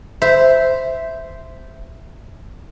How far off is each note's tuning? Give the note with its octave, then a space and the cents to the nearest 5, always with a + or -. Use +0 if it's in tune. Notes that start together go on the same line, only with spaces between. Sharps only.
C5 -10 E5 +0